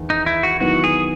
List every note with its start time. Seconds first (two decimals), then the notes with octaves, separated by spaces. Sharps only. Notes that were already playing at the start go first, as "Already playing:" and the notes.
Already playing: E2 D#3
0.10 D#4
0.26 E4
0.43 F#4
0.60 D#3 F#3 B3 E4 F#4
0.84 G#4